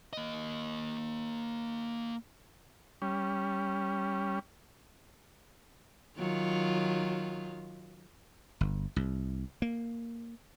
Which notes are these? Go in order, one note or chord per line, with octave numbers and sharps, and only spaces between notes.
A#3 D#5
G3 C#4
D#3 F#3 F4
G1
C2
A#3